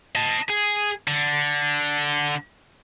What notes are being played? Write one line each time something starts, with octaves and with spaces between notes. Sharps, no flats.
D#5 A5
G#4
D3